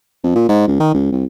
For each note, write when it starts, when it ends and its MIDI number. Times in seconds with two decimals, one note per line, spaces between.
0.24 0.35 41
0.36 0.45 46
0.49 0.64 44
0.68 0.77 37
0.79 0.92 51
0.94 1.09 37
1.12 1.24 36